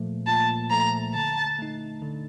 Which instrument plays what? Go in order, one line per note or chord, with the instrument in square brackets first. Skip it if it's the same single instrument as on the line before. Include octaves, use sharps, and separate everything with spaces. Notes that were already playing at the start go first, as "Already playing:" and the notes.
Already playing: [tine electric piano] A#2 F3 A3
[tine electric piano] A#2 [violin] A5
[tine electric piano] F3 A3 [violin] A#5
[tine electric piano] D3 [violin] A5
[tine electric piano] A3 D#4
D3